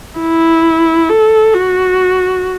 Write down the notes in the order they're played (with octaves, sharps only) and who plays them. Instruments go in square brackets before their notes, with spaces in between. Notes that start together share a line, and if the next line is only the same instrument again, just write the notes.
[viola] E4
A4
F#4